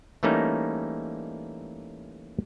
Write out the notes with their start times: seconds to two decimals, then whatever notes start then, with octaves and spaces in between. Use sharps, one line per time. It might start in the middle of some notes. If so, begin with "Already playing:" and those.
0.23 E3 G3 A3 A#3 C#4 D#4